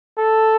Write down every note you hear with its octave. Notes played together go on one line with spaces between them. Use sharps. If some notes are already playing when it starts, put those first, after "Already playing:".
A4